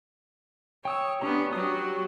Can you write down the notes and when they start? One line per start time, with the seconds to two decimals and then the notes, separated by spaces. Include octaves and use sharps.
0.85 C#5 G5 D#6 E6
1.21 B3 C#4 D4 G4 A#5
1.52 F#3 F#4 G4 D#6